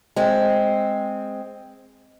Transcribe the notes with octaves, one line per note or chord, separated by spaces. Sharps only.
G#3 C4